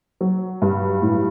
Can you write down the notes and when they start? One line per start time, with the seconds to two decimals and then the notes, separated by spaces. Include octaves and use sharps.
0.21 F#3
0.62 G2
1.02 A2